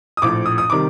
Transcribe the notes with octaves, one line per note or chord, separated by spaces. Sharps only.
D#6
A#1 A2 F3 D6
D#6
D#6
C3 D#3 G3 D6